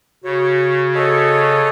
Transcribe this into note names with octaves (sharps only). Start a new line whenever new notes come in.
C#3 F#4 C#5
A4 C#5 D#5